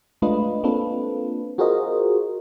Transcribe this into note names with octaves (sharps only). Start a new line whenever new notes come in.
G#3 A3 D4 F4 B4 D#5
A#3 C4 D4 F4 A4 B4
F4 F#4 G#4 A#4 C5 D#5